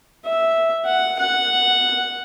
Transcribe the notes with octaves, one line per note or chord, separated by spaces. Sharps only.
E5
F#5
F#5